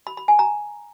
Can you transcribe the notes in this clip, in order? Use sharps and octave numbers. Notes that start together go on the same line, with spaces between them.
B5
B5
G#5
A#5